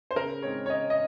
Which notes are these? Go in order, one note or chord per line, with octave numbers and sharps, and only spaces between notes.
C5
C#3 A#4
G#3 C4 D#4 C#5
C#5
C#3 D#5
D#5